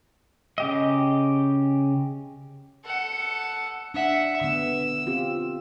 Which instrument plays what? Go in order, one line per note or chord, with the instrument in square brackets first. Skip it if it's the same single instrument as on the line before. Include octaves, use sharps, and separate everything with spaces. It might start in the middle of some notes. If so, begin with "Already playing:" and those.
[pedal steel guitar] C#3 G4 D#5
[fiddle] A4 F#5
[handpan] D4 [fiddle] E5 F#5
[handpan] D3 B3 [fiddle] E6
[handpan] C4 F4 G4